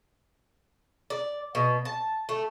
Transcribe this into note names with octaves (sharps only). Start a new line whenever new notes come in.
D5
B2
A5
A3